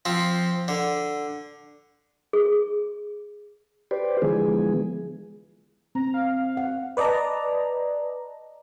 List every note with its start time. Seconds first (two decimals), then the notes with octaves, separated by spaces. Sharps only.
0.05 F3 C4
0.68 D3
2.33 G#4
3.91 G4 B4 C5 D5
4.22 D3 E3 F3 G#3 B3 G#4
5.95 C4 A#5
6.14 F5
6.57 F#5
6.97 B4 D5 D#5 A5 A#5